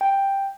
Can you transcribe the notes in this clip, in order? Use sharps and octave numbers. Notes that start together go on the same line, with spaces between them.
G5